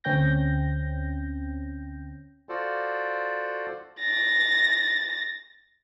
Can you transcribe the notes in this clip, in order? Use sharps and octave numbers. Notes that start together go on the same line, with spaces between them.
D2 C4 C#4 G5 G6 A#6
F4 F#4 A4 C5 D5
A6 A#6